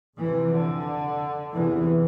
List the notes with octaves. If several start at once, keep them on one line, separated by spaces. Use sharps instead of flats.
F2 C3 E3
D3
E2 C3 E3